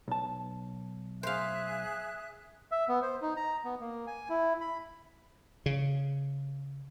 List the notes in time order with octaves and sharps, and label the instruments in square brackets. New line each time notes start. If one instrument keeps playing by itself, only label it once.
[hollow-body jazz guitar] B1 A5
[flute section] G#4 E5 F#6 [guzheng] C5 F5
[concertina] E5
B3
C5
D#4
A#5
B3
A#3
G#5
E4
B5
[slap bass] C#3